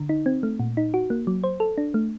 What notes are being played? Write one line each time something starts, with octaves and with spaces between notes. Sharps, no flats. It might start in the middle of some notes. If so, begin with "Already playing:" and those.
Already playing: D3
D#4
C4
A3
A#2
D#4
F#4
A#3
F#3
C5
A4
D4
A3